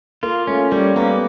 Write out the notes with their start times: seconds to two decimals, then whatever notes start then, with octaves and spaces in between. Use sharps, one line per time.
0.23 A#3 F4
0.47 A3 C#4
0.71 G3 A#3
0.96 A#3 B3